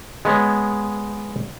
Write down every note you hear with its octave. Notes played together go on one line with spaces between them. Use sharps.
G#3 B3 C#5